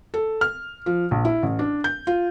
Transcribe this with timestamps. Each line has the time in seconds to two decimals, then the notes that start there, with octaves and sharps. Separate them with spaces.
0.14 A4
0.41 F6
0.86 F3
1.11 A#1
1.25 E4
1.43 A1
1.59 D4
1.84 G6
2.07 F4